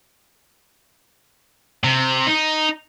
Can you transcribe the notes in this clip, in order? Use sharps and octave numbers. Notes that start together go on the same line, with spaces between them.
C3
D#4